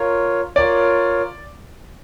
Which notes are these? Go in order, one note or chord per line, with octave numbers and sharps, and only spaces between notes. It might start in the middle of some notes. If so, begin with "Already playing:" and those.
Already playing: F4 A#4 C#5
F4 A#4 C#5 D5